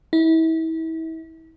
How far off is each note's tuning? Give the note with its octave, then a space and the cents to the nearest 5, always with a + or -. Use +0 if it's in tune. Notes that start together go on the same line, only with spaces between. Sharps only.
E4 -35